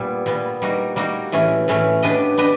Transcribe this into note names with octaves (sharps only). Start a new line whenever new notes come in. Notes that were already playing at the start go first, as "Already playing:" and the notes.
Already playing: A#2 G3 B3
A#2 G3 B3
G3 A#3 D#4 F#4
G3 A#3 D#4 F#4
A2 E3 A3 C#4
A2 E3 A3 C#4
B3 D4 G4 B4 D#5
B3 D4 G4 B4 D#5